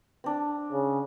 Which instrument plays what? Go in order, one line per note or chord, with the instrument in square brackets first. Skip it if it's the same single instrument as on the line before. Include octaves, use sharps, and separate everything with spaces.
[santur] C4 D4
[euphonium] C#3